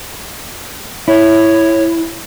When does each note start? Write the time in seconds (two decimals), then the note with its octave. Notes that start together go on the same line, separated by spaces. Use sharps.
1.08 E4 C#5